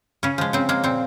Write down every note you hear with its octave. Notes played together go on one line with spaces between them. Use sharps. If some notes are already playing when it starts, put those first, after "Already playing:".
C#3 C#4
F3 G#3
C#3 C4
G#3 A#3
A#2 C4